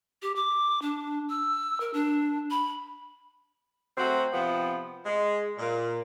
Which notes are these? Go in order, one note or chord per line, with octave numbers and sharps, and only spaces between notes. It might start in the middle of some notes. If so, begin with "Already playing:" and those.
G4
D6
D4
E6
A#4
D4
B5
F#3 A3 C4 F#4
C3 F3 B3
G#3
A#2